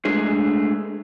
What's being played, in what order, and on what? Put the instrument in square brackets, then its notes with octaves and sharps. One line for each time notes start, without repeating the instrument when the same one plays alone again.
[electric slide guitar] G#3 A3 D4 G#4